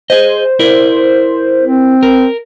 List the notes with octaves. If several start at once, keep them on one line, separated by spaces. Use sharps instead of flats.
G#4 C5 D#5
E4 A#4 D5
C4
A#4